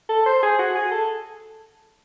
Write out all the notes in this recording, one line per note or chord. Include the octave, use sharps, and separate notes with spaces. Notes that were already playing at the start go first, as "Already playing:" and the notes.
A4
C5
G#4
F#4
G#4
A4